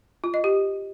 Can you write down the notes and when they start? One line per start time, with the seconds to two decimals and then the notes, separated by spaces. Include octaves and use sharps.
0.24 F4
0.34 D#5
0.44 G4